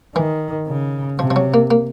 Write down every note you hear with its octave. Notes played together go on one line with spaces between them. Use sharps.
D#3 E3
C#3
C3 F3
F3
F#3
A#3
A#3